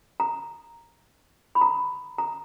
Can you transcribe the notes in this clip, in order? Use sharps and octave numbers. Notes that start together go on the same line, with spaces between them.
A#5
B5
A#5
A#5